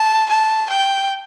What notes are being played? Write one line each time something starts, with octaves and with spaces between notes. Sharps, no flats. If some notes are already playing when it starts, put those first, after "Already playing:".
Already playing: A5
A5
G5